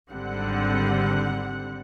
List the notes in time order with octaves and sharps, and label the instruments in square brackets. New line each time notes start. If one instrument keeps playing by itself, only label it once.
[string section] G#1 D3 G3 C4 F#5